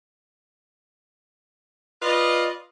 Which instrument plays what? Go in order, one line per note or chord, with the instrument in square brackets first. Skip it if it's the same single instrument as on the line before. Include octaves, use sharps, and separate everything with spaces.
[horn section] F4 B4 D5 D#5